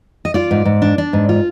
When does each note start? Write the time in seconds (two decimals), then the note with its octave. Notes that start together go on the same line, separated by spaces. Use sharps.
0.25 D#5
0.34 F4 D5
0.51 G#2
0.65 G#2
0.82 D4
0.98 D4
1.13 G#2
1.29 F4